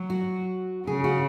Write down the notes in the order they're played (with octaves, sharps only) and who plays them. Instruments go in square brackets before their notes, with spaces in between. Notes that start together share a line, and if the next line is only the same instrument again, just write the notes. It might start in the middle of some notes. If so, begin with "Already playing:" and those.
Already playing: [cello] F#3
[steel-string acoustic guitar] F#4
[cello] C#3 [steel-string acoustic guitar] G#4
[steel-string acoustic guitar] F#4